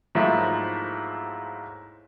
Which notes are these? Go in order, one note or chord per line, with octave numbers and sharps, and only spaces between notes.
G#2 F3 F#3 A3 A#3 E4